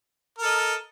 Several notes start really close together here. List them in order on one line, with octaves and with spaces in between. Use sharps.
A#4 A4 D#5